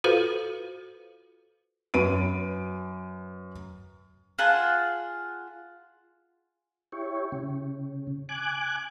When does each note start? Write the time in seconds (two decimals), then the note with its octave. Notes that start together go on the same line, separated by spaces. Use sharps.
0.04 F4 F#4 A4 B4 C5 F5
1.94 F#2 B4 D7 D#7
4.39 F4 G#4 F#5 A5
6.92 E4 G4 C#5
7.32 C#3
8.29 G#5 D6 F#6